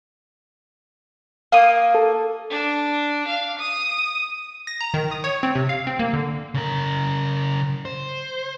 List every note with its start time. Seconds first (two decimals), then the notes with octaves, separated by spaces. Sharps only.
1.52 A#3 F5 D#6
1.95 A4
2.50 D4
3.27 F5
3.59 D#6
4.67 A#6
4.81 A#5
4.94 D#3
5.11 D#6
5.24 C#5
5.43 C4
5.55 C3
5.69 F5
5.87 C4
5.99 A#3
6.13 D3
6.54 C#3 A#4
7.85 C5